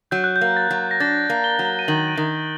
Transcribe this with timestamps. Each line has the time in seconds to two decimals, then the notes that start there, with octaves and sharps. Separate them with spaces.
0.11 F#3 G6
0.24 F#6
0.36 G6
0.41 A#3
0.57 A6
0.70 F#3
0.91 A#6
1.00 D4 A6
1.30 A#3
1.44 G7
1.59 F#3
1.65 G7
1.79 D#7
1.88 D#3 F#7
2.08 D7
2.17 D#3 D#7